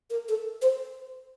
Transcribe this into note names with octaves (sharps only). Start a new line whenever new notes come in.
A#4
A4
C5